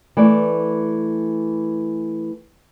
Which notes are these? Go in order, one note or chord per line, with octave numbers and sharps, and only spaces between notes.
E3 A3 D5